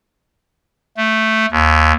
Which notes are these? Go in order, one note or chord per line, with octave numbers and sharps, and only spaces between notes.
A3
D#2